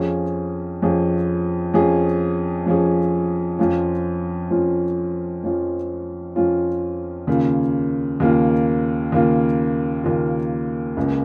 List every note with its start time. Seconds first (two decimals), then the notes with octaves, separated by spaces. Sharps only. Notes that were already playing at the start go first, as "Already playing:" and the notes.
Already playing: F2 F3 C#4 G#4
0.82 F2 F3 C#4 G#4
1.74 F2 F3 C#4 G#4
2.66 F2 F3 C#4 G#4
3.59 F2 F3 C#4 F4
4.51 F2 F3 C#4 F4
5.44 F2 F3 C#4 F4
6.36 F2 F3 C#4 F4
7.27 D#2 C#3 A#3 F4
8.20 D#2 C#3 A#3 F4
9.12 D#2 C#3 A#3 F4
10.04 D#2 C#3 A#3 F4
10.97 C#2 C#3 A#3